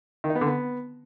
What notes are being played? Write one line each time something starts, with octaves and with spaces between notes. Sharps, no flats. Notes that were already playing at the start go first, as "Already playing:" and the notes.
D#3
D#4
B3
D3
B3